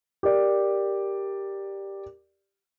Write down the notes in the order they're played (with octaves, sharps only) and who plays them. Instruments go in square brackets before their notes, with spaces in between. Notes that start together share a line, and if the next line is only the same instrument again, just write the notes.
[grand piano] G4 A#4 D5